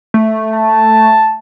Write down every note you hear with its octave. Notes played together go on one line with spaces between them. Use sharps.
A3
A5